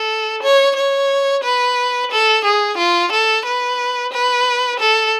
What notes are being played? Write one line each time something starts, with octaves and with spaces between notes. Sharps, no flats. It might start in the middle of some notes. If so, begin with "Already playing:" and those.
Already playing: A4
C#5
C#5
B4
A4
G#4
F4
A4
B4
B4
A4